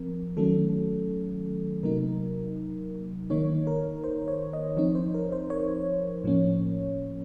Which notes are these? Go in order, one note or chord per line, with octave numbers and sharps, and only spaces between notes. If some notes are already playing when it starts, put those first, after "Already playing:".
Already playing: F3 C4 A#4
D#3 F#3 A3 C#4 A4
C3 F#3 A#3 D#4 A#4
D#3 A#3 D#4 C#5
A#4
C5
C#5
D#5
F3 C4 D#4 C#5
C5
A#4
C5
C#5
A2 F3 A#3 C#4